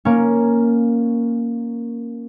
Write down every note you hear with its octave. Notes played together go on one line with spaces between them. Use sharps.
A#3 C#4